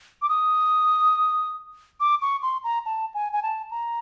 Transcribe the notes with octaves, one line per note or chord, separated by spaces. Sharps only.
D6
D#6
D6
C#6
C6
A#5
A5
G#5
G#5
A5
A#5